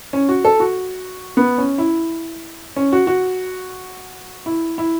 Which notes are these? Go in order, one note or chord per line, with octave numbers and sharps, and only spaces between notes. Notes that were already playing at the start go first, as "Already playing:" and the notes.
C#4
F#4
A4
F#4
B3
C#4
E4
C#4
F#4
F#4
E4
E4